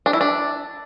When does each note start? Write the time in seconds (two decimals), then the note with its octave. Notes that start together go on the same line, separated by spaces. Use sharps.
0.06 D4
0.13 E4
0.21 D4